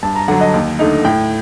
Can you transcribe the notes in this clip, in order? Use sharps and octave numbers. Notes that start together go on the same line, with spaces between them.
G2 A5
A#5
D3 F#3 F#5
D#5
D#2
D3 A3 D#4
A2 G5